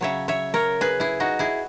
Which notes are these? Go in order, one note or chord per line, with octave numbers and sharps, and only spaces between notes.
C#3 F#3 C#5 E5
C#5 E5
A#4 C#5
G#4 B4
E4 G#4
D#4 F#4
E4 G#4